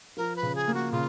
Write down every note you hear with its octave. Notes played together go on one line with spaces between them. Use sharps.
F3 A#4
B4
C#3
G#4
A#3
F#4
C#3 F4